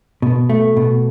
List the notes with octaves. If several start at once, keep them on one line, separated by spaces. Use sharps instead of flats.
B2
A3
B2